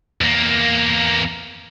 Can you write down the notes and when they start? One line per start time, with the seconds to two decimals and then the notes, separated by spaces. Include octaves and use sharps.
0.21 E2 A#3